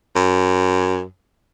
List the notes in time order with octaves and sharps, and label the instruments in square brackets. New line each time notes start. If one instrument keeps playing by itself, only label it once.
[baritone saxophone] F#2